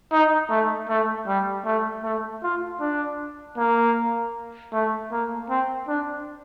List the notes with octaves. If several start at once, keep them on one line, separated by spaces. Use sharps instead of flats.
D#4
A3
A3
G3
A3
A3
F4
D4
A#3
A3
A#3
C4
D4